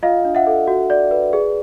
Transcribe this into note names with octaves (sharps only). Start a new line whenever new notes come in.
F4 D#5 F5
D4
E5 F#5
A4
F#4
D5
B4
G#4